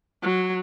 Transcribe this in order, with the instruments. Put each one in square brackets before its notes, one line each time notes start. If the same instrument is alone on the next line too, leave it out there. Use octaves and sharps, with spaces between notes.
[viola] F#3